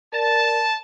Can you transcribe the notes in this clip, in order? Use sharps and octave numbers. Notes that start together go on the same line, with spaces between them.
A#4 D5 A5